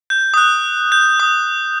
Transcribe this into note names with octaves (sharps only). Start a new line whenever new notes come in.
G6
D#6
F#6
G6
D#6